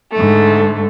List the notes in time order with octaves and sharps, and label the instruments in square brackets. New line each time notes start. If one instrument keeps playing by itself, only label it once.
[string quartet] G#2 D3 A3